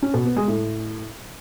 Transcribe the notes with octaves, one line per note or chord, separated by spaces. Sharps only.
C#4
B2
B3
G#3
A2